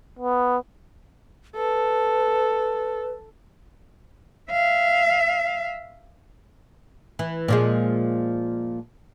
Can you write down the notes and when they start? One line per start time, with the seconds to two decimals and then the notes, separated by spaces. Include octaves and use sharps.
0.19 B3
1.56 A4 B4
4.51 E5 F5
7.19 E3
7.48 A#2 F3 G#3